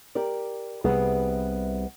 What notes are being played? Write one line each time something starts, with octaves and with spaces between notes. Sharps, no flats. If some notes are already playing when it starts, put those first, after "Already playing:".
G4 A#4 D5
C2 C3 G3 B3 G#4